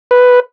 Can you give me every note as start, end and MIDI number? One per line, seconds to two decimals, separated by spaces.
0.11 0.40 71